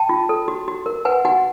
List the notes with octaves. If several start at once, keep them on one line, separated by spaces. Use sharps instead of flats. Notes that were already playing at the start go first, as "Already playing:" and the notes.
Already playing: G5 A5
F4
A4
F#4
F#4
A#4
B4 F#5 G#5
F#4 F#5 G#5